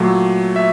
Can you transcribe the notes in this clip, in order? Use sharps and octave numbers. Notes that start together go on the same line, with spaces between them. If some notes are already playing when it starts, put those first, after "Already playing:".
Already playing: A#2 F#3 A3
E5